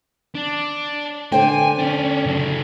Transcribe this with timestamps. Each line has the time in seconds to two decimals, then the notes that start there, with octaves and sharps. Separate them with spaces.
0.35 D4
1.32 D3 C5 G5 G#5
1.78 C#4 D4
2.26 C#3 F#3